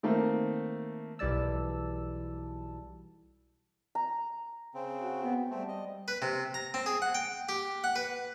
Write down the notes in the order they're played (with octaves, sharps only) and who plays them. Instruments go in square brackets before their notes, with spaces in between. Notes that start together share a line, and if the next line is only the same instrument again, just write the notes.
[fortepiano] D#3 A3 A#3 C4
[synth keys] B1 E3 G3 D5 A5 E6
[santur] A#5
[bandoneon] C#3 C4
[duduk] F#4
B3
[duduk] G3 [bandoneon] A3 C4
[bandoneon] D#5
[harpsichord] B4
C3
A#5
C4
G#4
F#5
G5
G4
F#5
B4